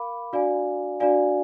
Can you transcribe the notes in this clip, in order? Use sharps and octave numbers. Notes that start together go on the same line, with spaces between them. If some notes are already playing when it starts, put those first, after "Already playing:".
Already playing: A#4 F5 B5 D6
D4 F#4 D5 F5 G#5
D4 F#4 D5 F5 G#5